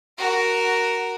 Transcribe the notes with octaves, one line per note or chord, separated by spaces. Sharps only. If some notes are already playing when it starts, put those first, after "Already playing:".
F#4 A#4